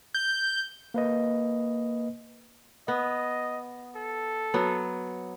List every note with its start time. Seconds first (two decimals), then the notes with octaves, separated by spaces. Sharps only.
0.14 G6
0.94 A#3 B4 D#5
2.88 B3 D#5
3.96 A4
4.54 F#3 B3